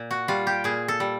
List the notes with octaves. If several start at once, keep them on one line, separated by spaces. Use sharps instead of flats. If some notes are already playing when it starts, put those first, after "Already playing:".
Already playing: A#2
F#4
G3 F4
G4
A#2 G#4
A4
G3